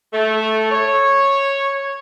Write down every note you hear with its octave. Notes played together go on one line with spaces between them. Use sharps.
A3
C#5